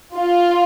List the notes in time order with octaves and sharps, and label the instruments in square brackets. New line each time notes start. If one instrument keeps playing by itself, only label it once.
[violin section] F4